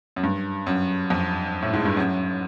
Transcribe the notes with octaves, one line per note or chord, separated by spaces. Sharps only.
F#2
G2
F#2
F2
A2
G#2
G2
F#2